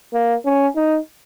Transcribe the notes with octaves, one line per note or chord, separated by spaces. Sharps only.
A#3
C#4
D#4